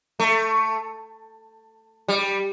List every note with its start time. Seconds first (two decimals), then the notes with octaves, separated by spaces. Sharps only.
0.20 A3
2.08 G3